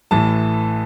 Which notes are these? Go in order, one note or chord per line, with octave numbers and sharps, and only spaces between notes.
A1 A2 E3 A5